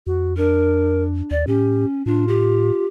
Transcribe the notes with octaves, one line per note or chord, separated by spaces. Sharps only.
F2 F#4
D4 A#4
D#2 D5
A2 C#4 G4
A2 D4 F4
G4